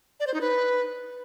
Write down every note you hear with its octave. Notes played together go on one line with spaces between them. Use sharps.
D5
C5
D#4
B4